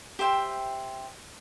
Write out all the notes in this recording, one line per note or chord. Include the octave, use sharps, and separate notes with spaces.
G4 C5 E5 G5